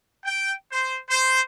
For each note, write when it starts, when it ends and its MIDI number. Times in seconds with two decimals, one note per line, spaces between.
0.24 0.53 79
0.72 0.98 72
1.08 1.39 72